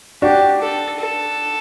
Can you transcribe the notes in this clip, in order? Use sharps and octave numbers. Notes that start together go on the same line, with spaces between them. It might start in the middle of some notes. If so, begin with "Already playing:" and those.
D4 F#4 G4
A4
A4